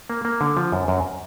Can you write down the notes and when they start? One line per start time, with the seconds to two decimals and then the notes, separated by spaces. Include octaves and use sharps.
0.10 A#3
0.25 A#3
0.41 D3
0.57 F3
0.72 F#2
0.88 F#2